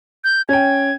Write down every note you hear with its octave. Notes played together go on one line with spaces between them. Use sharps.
G6
C#4 G5 G#6